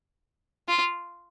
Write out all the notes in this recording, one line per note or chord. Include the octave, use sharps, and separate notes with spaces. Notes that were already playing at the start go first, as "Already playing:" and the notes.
F4